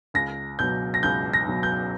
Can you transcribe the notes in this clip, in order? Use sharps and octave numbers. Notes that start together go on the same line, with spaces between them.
C#2 A#6
B2 F#3 G6
A#6
C#2 G6
A#6
B2 F#3
G6